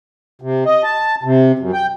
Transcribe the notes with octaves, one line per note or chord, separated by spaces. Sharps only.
C3
D#5
A5
C3
F#2
G5